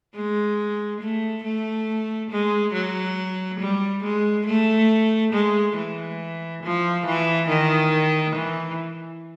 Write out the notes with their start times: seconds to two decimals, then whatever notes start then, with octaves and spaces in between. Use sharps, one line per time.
0.15 G#3
1.01 A3
1.44 A3
2.31 G#3
2.74 F#3
3.60 G3
4.04 G#3
4.46 A3
5.33 G#3
5.77 E3
6.63 F3
7.06 E3
7.49 D#3
8.36 E3